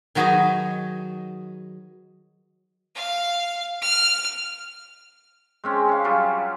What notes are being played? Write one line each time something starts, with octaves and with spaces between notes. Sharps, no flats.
D#3 F#3 F#4 G#4 B4 D#5
F5
F6
G#3 C4 C#4
C#4 F5
F#3 G3 F4